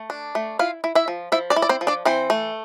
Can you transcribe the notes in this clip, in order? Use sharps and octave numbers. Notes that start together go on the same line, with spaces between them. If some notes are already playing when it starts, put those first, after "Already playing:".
Already playing: A3
D4
A3
E4 F4 F5
E4
E4 E5
F3
F3 E4 E5
D4 D5
E4
D5
C4 C5
F3
D4 D5
E3 C4 C5
A3